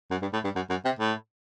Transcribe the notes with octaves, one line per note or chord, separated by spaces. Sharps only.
F#2
G2
A2
G2
F#2
F#2
C3
A2